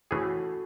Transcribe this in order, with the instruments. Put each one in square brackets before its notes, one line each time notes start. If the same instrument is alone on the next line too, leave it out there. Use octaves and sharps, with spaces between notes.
[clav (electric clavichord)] E3 A3 C#4 G#4 [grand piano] F#4 A4